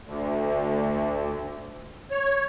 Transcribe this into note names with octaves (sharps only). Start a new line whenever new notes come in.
D2
C#5